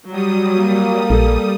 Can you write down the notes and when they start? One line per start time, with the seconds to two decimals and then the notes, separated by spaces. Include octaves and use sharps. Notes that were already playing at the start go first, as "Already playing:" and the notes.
0.11 F#3 G3 D#6
0.57 A#3
1.10 A#1 A4